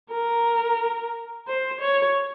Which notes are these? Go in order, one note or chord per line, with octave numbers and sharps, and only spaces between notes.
A#4
C5
C#5